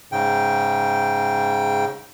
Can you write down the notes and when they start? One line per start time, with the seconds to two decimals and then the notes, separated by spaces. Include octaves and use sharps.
0.12 G#2 C#3 G5